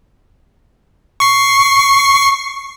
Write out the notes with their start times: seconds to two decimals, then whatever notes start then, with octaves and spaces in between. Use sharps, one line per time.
1.20 C#6 C7